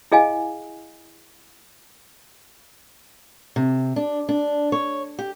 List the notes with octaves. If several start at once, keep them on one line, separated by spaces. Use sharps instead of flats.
E4 G#4 D#5 F5 G#5
C3
D4
D4
C#5
G4